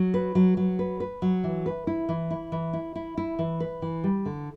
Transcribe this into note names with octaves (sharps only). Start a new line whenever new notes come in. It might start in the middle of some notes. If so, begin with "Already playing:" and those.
Already playing: F#3
B4
F#3
F#3
B4
B4
F#3
E3
B4
E4
E3
E4
E3
E4
E4
E4
E3
B4
E3
G3
D3